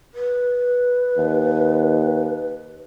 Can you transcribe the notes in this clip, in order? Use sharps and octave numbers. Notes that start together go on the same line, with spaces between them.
B4
D#2